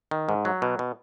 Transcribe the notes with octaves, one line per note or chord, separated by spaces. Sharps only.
D#3
G#2
F#3
B2
B2